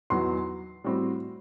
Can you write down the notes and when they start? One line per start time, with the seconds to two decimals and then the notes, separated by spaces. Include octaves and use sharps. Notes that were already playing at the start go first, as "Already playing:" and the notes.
0.10 E2 D#3 F#3 B3 F#4 C6
0.84 A2 G3 C4 F#4